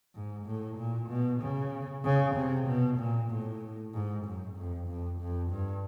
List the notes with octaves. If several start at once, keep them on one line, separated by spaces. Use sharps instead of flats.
G#2
A2
A#2
B2
C#3
C#3
C3
B2
A#2
A2
G#2
F#2
F2
F2
F2
G2